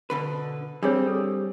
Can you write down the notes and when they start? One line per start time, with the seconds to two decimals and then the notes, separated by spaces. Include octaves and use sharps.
0.10 B2 D3 B4
0.83 G3 C4 D4 G#4 C#5
1.07 A4